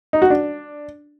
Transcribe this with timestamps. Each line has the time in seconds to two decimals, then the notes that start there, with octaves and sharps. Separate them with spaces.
0.13 D#4
0.22 F#4
0.30 D4